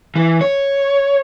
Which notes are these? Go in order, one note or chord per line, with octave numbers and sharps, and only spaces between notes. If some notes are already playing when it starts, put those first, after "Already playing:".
E3
C#5